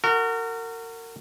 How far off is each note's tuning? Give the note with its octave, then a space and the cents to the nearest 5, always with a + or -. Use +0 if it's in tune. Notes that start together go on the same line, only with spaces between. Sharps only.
F#4 +0 A#4 -30